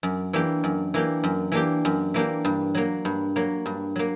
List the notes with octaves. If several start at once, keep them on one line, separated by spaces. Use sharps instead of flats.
F#2
E3 A#3 D4 G4
F#2
E3 A#3 D4 G4
F#2
E3 A#3 D4 G4
F#2
E3 A#3 D4 G4
G2
F#3 A#3
G2
F#3 A#3
G2
F#3 A#3